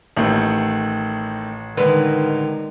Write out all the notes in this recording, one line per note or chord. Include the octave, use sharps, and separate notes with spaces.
A1 D#3 A3
D3 D#3 G#3 B4